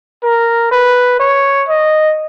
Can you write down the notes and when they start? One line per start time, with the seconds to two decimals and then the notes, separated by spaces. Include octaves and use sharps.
0.23 A#4
0.71 B4
1.20 C#5
1.68 D#5